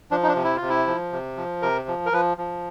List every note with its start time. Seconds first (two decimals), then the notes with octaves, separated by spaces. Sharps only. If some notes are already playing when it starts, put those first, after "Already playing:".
0.11 F3 D4
0.23 D#4
0.28 D4
0.35 C3
0.44 E4
0.57 C3 F4
0.69 E4
0.87 F3
1.12 C3
1.36 F3
1.62 C3 A#4
1.88 F3
2.06 A#4
2.12 F3 B4
2.38 F3